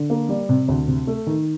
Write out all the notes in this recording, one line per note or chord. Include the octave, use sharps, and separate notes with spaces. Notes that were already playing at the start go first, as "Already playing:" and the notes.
Already playing: D3
A#3
G3
C3
D2
C3
A3
D#3